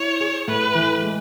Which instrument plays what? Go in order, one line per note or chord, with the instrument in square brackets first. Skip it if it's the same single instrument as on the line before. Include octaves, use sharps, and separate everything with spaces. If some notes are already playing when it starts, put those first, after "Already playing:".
Already playing: [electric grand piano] E4 [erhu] C#5
[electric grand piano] G#4
[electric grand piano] A2 [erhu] B4
[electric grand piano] E3
G#3